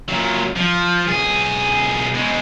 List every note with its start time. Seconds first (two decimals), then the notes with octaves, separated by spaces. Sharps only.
0.08 A#2 F#3
0.56 F3
1.08 B1 G#4
2.14 B2 G#3